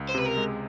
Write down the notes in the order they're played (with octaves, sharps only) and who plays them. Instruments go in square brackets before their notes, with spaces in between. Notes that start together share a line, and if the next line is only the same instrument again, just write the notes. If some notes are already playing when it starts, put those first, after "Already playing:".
Already playing: [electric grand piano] C#2
[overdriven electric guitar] C5
[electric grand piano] C3 [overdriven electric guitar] B4
[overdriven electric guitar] A#4
[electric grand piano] G#3